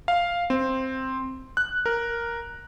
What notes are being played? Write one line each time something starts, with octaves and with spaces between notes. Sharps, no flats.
F5
C4
F#6
A#4